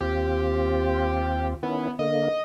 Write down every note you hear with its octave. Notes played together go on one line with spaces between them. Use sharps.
D#2 C4 F4 G4
D#3 B3 C#4 E4
D3 A#3 D#5